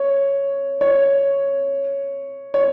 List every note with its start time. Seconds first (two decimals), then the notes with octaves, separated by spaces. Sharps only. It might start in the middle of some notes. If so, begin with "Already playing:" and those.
Already playing: C#5
0.81 C#5
2.54 C#5